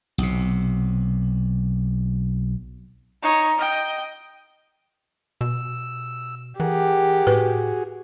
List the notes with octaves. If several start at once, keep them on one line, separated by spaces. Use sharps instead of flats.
B1 C3
D#4 C#5
D#5 G5
B2 E6
E3 G4 G#4 A#4 F#5
A2 F#4 G#4 B4